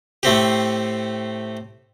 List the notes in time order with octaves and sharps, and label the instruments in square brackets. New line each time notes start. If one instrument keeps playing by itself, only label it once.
[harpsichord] A2 A3 C4 G4